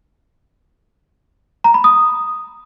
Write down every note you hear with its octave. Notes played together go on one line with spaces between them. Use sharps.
A#5
B5
D#6